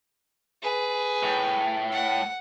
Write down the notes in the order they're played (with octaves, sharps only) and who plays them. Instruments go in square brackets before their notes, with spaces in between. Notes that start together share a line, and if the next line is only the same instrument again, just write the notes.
[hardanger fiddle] G#4 B4
[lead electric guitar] A2
[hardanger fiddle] F#5